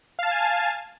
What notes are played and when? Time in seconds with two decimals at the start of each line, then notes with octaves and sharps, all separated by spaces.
0.19 F5
0.23 A5
0.27 A6
0.31 G#5